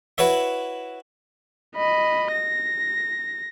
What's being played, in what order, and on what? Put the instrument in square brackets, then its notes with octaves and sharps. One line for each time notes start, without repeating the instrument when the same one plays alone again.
[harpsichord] E4 F#4 B4 C#5 E5
[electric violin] D#5 B5
A#6